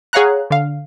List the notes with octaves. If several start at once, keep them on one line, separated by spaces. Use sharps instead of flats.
G#4 C#5 F5 F#5 A#5 F#6
D3 F5